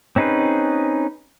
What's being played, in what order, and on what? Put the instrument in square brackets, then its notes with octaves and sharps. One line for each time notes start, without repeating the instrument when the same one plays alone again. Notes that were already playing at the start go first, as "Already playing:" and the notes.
[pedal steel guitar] C4 C#4 D#4 G#4 B4